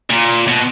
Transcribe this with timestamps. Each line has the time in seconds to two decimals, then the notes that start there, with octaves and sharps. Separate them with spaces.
0.10 A#2
0.47 B2